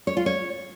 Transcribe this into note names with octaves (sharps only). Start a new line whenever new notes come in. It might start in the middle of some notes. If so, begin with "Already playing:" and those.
C#5
F4
C#5